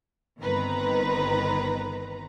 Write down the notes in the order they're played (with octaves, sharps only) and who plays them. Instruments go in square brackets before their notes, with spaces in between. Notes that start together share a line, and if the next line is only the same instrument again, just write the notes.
[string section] G1 D#3 C4 B4 A#5